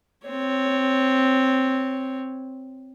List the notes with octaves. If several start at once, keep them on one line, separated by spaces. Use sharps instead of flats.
C4 C#5